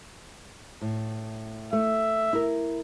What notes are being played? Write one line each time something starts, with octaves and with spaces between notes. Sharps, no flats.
A2
A3 E5
E4 A#4